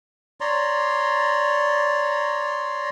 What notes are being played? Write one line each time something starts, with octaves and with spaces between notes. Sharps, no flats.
C#5 D5 A#5 C6